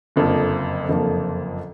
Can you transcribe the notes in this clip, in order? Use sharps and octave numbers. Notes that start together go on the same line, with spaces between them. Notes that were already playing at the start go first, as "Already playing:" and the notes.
F#1 F2 D3 F3 A#3
F#1 F2 D3 F3 A#3